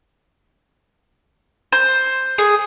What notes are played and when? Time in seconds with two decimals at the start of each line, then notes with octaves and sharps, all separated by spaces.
1.72 C5
2.38 G#4